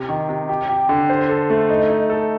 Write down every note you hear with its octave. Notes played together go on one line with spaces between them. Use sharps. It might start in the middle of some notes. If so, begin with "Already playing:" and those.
Already playing: C3
D#3
C3
G4
G4
D3
C5
A4
A3
D#4
D#4
A4